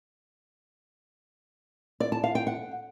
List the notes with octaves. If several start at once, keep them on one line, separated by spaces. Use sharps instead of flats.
D5
A5
F5
G5
F#5